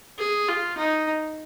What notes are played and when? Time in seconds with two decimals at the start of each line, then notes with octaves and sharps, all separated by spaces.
0.18 G#4
0.48 F4
0.77 D#4